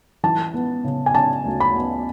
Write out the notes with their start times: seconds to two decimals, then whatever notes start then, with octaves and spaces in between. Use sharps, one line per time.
0.23 E3 A5
0.54 B3
0.84 C#3
1.06 G#5
1.15 C#3 A5
1.45 D2
1.60 B5
1.75 B3